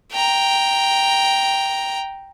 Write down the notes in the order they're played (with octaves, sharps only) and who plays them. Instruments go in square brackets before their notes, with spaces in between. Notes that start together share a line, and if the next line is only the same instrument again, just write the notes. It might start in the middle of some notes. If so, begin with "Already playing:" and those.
[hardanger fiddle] G5 A#5